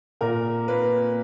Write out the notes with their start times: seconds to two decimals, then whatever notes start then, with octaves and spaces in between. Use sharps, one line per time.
0.21 A#2 A#4
0.68 A#3 B4